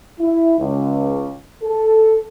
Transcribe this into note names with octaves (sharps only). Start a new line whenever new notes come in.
E4
C#2
A4